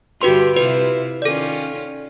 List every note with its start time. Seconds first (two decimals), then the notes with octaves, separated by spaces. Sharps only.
0.22 G2 D3 F#4 G4 B4 C6
0.56 C3 E4 F4 G4 B4
1.22 D#3 C#4 F4 A4 D5